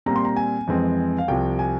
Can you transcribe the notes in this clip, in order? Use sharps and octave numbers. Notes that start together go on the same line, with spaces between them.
A#2 G3 C4 A#5
C6
A#5
G#5
F2 E3 G#3 C4
F5
C2 C3 F3 G5
G#5